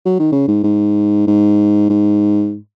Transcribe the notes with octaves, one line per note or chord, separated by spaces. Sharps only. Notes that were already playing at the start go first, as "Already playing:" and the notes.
F#3
D#3
C#3
G#2
G#2
G#2
G#2